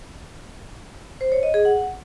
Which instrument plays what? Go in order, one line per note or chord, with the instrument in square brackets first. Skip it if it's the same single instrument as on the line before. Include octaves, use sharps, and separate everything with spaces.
[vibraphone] C5
C#5
D#5
G#4
F#5